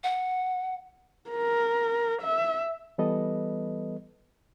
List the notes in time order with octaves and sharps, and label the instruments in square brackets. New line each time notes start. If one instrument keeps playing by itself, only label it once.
[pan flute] F#5
[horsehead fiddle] A#4
E5
[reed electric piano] E3 G3 B3 A4 B4 D#5